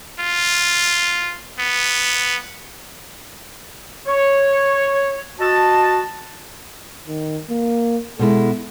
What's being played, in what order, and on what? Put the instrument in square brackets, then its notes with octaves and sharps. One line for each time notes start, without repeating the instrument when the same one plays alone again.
[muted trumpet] F4
B3
[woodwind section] C#5
F#4 D#5 A5
[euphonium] D#3
A#3
[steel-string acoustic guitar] B2 G#3 E4 [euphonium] A4